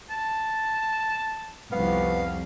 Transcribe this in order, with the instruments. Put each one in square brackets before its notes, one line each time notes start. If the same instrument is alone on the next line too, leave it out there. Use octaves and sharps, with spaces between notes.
[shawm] A5
[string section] C2 F2 [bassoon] B3 [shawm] F5